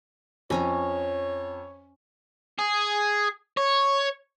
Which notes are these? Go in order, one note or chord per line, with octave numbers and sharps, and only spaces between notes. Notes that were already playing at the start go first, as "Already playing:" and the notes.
F2 C#4 C#5 G#5 A#5
G#4
C#5